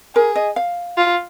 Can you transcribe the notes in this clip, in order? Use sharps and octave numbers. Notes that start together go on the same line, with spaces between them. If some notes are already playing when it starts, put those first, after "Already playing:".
G#4 A#4
D#5
F5
F4